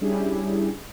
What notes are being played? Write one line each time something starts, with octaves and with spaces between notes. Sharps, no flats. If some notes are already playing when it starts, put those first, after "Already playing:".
G3 C#4 D4 E4 G4 G#4